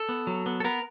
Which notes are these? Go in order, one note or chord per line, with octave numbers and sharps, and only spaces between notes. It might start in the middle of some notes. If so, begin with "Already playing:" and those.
Already playing: A4
B3
F#3
B3
A4
B3 A#4